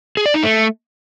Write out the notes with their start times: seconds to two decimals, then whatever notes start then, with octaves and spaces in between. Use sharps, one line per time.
0.17 G#4
0.26 D5
0.34 D#4
0.43 A3